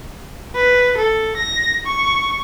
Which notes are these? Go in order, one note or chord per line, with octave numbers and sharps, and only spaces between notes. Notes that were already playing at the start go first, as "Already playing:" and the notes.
B4
A4
A#6
C#6